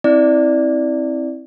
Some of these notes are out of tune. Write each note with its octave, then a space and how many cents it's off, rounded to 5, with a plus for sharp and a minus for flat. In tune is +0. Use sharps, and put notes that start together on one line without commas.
C4 +15 E4 -25 D5 +0